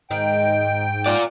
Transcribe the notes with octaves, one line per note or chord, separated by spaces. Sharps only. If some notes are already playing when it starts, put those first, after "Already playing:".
G#2 D#3 D#4 G5
F4 D5 F#5